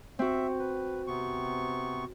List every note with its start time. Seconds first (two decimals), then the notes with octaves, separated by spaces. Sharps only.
0.19 C4 F#4 E5
0.59 B4
1.07 C3 B3 C#6